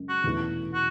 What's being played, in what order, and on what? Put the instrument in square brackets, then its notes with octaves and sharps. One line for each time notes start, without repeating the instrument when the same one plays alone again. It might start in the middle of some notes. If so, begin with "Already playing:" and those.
Already playing: [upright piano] F#2 C#3 G#3
[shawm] F#4
[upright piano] E2 B2 A3 E4
[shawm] F#4